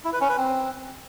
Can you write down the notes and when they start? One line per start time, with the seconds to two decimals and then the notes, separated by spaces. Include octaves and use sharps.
0.05 E4
0.13 B4
0.21 C#4
0.29 B4
0.37 C4